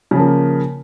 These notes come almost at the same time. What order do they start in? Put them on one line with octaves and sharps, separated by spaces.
C#3 F3 A#3